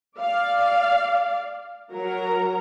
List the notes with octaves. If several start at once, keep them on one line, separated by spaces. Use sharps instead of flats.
D5 F5
F#3 A#4 A#5